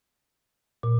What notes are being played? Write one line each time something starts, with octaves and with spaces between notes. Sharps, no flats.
A#2